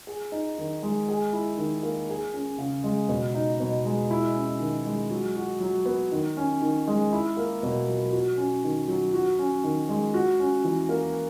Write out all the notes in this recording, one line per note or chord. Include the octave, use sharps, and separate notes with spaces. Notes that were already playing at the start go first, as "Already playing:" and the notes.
G#4
D#4
D#3
G#3
G#4
E4
D#3
A#3
G#4
C#4
C#3
G#3
B2
D#4
B2
G#3
E4
C#4
D#3
G#3
F#3
F#4
F#3
B3
D#3
C#4
D#3
G#3
E4
A#3
B2
F#3
F#4
C#4
D#3
F#3
F#4
C#4
D#3
G#3
F#4
C#4
E3
A#3